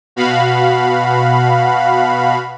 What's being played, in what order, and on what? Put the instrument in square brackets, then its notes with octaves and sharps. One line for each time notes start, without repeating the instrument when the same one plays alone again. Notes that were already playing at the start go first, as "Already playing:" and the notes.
[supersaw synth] B2 F#4 F5 B5